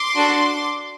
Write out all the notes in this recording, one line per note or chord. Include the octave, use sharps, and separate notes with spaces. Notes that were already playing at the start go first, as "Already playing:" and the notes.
Already playing: C6 D6
D4 F#4 A4